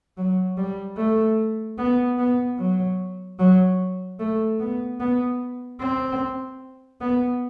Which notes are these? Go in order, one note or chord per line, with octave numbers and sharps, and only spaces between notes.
F#3
G3
A3
B3
B3
F#3
F#3
A3
B3
B3
C4
B3